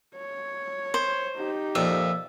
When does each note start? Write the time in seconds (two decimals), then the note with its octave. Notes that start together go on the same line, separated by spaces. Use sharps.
0.16 C#5
0.94 C5
1.37 D#4 G4
1.75 F2 A#2 E5